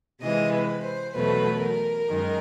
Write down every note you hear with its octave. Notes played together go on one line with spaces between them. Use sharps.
C3 E3 G#3 D#5
B4
C5
E2 B2 F#3 A3 B4
A#4
F#2 D#3 G#3